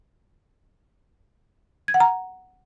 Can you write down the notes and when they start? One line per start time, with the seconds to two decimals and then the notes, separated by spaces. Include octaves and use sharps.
1.88 G#6
1.94 F#5
2.00 A#5